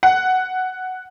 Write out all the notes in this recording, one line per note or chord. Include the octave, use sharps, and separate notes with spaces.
F#5